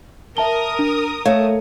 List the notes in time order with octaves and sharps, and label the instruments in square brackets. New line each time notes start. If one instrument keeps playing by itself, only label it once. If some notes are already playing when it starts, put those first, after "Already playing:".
[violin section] A#4 D#6 [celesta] E5 A5 G7
[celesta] D4
[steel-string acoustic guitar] A3 [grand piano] C#5 [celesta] F5